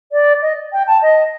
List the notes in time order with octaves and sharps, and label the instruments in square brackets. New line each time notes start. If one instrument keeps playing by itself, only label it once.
[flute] D5
D#5
G5
A5
D#5